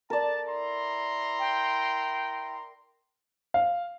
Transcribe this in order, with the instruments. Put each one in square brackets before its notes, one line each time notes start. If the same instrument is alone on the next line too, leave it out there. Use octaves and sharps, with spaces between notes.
[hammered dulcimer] A#4 D5 [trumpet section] A5
[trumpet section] E4 A#5 C6
[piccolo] G5
[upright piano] F5